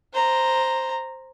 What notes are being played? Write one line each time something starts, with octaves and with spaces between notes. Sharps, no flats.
C5 A#5